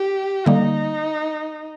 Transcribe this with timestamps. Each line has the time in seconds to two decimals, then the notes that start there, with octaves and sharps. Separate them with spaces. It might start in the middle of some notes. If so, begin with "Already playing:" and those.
Already playing: G4
0.46 D3 G3 A#3 D#4